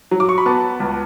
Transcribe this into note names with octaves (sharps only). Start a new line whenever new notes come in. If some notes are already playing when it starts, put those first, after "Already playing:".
F#3
D6
C#6
B5
B3 A5
C#2